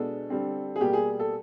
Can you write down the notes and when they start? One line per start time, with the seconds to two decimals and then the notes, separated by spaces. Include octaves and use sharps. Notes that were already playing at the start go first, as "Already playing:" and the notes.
Already playing: B2 G#3 B3 D4 A4
0.30 D3 G3 C4
0.76 G#4
0.80 B2 G3 A#3 G4
0.93 G#4
1.20 A4